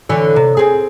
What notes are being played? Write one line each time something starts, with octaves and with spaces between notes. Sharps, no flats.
D3 E3 C#5
C3
C4 G#4